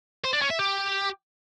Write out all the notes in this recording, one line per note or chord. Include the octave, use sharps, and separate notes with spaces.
C5
D4
C#4
E5
G4